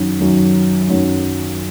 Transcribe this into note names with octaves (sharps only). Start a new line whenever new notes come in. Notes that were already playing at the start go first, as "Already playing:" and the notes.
Already playing: F#2 D#3 F#3 C#4
F#2 D#3 F#3 C#4
F#2 D#3 F#3 C#4